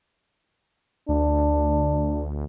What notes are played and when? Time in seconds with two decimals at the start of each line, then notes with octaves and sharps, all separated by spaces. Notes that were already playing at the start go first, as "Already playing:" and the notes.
1.09 D2 D4